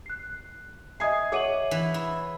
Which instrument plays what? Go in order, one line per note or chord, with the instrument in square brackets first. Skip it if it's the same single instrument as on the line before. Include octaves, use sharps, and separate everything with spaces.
[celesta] F#6 C7
[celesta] D#5 D#6 C7 [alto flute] E5 [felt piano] G#5 G#6
[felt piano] G#4 C#5 F#5 [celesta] D6 D#7 F#7
[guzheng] E3
E4